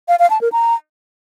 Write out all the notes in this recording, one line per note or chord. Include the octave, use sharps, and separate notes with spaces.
F5
F5
A5
A#4
A#5